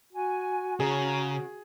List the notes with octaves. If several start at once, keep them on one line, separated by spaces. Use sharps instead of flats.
F#4 G#5
C#3 C#4 G#4 A#5